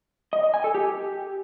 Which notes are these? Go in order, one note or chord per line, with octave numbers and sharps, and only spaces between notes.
D#5
D#5
G#5
A4
G4